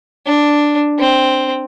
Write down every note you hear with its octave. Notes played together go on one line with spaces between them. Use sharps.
D4
C4